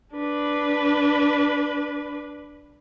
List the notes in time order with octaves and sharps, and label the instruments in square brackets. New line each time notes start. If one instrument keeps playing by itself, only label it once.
[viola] D4 B4